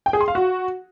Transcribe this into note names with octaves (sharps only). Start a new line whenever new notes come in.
G5
G#4
C6
F5
F#4